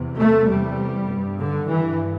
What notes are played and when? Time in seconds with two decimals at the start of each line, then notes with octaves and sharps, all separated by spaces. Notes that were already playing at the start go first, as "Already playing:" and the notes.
Already playing: E2 C3
0.17 A3
0.47 E2 C3 G3
1.08 G2
1.38 D3
1.68 G2 E3